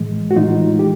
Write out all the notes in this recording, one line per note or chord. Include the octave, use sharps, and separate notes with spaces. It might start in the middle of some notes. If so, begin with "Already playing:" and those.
Already playing: A2 E3 G#3
F#4
A2 E3 G#3 D#4 F4
G4